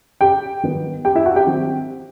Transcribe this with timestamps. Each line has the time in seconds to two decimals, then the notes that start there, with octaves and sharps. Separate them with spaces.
0.21 G4 G5
0.63 D#3 G3 B3
1.05 G4 G5
1.15 E4 E5
1.26 F#4 F#5
1.36 G4 G5
1.47 D#3 G3 C4